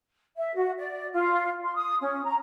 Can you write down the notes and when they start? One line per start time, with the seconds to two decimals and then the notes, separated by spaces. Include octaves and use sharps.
0.36 E5
0.55 F#4
0.77 D5
1.11 F4
1.63 C6
1.75 D#6
2.00 C#4
2.23 A#5